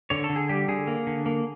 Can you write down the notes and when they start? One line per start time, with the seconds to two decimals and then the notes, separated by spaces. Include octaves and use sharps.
0.10 D3 C#5
0.24 A4
0.30 D3
0.36 G#4
0.49 G3 G4
0.68 D3 G#4
0.87 A#3
1.07 D3
1.26 A#3